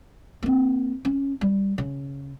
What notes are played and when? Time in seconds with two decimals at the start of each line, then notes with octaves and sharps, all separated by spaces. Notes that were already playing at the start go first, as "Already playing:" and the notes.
0.43 A#3 C4
1.05 C#4
1.41 G3
1.78 C#3